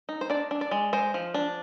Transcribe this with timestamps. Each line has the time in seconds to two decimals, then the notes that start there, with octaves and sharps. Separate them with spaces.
0.09 D#4
0.21 C5
0.30 D4 D5
0.51 D4
0.61 D5
0.71 G#3
0.93 G#3 C5
1.14 F3
1.34 D4